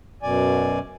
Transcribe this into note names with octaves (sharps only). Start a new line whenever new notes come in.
F#2 B2 D5 G#5